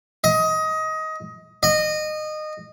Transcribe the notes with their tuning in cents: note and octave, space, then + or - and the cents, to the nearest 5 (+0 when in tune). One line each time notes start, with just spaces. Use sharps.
D#5 +20
D#5 -20